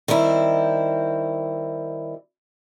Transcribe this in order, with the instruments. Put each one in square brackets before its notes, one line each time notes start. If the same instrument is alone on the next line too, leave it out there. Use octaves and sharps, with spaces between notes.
[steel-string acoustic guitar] D#3 G3 C4 E4